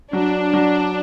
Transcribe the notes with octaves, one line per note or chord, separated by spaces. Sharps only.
F#3 D4
F#3